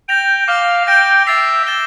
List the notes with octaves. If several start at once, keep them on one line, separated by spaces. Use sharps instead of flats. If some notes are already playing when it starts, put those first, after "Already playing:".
G5 G6 A#6 F7
F5 D6 F6 A#6
G5 G6 A#6 D7
E5 A6 C7 F7
A6 E7 G7